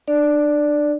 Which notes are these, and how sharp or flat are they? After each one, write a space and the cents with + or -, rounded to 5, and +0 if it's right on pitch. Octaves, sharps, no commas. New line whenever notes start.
D4 +30 D5 +0